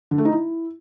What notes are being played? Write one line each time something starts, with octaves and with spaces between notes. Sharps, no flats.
D3
A3
D#4
E4